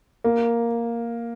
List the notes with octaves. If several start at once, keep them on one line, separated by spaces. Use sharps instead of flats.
A#3